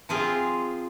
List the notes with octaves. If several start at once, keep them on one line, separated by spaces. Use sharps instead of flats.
F3 C4 F4 G#4